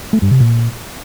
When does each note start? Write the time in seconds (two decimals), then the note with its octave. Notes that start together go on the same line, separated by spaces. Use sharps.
0.13 A3
0.22 G2
0.31 C3
0.40 A#2